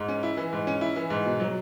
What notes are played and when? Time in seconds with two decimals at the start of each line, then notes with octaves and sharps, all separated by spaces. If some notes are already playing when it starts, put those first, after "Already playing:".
Already playing: G#2
0.08 C#4
0.23 E4
0.37 E3
0.53 G#2
0.67 C#4
0.81 E4
0.96 E3
1.10 G#2
1.25 B2
1.40 F#3